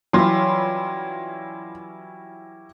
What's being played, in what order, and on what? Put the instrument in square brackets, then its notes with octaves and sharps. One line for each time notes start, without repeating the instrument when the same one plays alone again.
[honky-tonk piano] E3 F#3 F4 [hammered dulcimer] G3 C#4 E4 [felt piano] C6